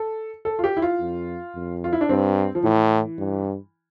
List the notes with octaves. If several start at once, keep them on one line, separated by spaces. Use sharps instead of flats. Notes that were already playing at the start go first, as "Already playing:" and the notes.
Already playing: A4
A4
F4
G4
E4
F4
F2
F2
F4
E4
D4
G2 C4
F3
A2 E3
G2